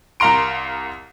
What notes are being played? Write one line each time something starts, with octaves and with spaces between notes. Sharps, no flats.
C2 A#4 F5 A#5 C6 D7